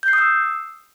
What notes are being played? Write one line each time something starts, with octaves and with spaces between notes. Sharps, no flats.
G6
C7
D#6
E6